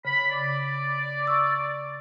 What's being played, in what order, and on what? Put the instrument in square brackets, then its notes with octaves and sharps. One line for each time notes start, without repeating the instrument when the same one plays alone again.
[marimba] C#3 [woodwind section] B5
[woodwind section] D5
[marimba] C#6 E6